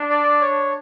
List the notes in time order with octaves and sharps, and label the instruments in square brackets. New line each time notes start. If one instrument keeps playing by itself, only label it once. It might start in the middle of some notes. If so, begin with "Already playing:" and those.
Already playing: [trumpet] D4
[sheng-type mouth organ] D5
C#5